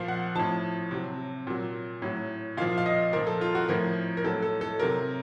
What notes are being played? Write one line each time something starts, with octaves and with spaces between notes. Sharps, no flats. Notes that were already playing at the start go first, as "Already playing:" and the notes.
Already playing: A#2 F3 F5
F#5
A2 F3 A5
C3 F#3
A#2 F#3
A2 F#3
A#2 F3 F5
F5
D#5
A#2 F3 A#4
A4
F4
F#4
A2 F3 A#4
A#4
A2 F#3 A4
A4
A4
C3 F#3 A#4